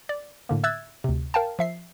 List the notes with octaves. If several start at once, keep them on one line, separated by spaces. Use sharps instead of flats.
D5
A2 D3 A#3
E5 E6 F#6 G#6 A6
D2 C3
A#4 F5 G5 A5
F3 E5 C7